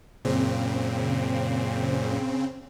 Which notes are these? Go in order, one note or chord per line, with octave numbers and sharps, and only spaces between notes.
F#2 A#2 C#3 C4